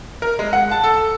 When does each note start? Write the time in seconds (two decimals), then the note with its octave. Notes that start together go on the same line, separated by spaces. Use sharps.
0.22 A#4
0.39 G#3
0.53 F#5
0.71 A5
0.84 A4